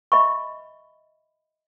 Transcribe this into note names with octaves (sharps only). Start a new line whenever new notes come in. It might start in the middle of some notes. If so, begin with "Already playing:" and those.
D#5 E5 B5 C#6